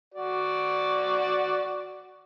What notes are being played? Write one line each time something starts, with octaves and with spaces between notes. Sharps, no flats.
F#4 D5